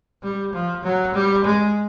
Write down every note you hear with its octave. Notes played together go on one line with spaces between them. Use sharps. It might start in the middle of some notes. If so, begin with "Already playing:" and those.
G3
F3
F#3
G3
G#3